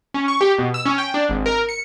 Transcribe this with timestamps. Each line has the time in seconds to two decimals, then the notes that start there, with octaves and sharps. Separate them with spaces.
0.14 C#4
0.28 C#6
0.41 G4
0.58 B2
0.74 E6
0.86 C#4
0.98 G5
1.14 D4
1.29 G#1
1.46 A#4
1.69 C#7